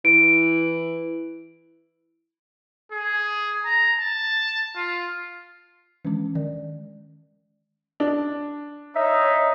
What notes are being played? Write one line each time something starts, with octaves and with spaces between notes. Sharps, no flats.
E3 D7
G#4
A#5
A5
F4
D#3 E3 G#3 C#4 D4
D#3 D5
D4
D#4 C#5 E5